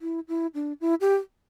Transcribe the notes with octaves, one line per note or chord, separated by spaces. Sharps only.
E4
E4
D4
E4
G4